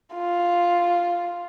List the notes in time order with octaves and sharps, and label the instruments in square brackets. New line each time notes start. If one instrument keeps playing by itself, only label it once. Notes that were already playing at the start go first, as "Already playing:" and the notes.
[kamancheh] F4